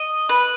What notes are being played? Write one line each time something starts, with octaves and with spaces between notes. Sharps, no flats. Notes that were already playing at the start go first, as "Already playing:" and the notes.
Already playing: D#5
B4